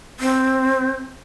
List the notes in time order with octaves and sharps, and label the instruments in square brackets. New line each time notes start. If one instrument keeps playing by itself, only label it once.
[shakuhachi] C4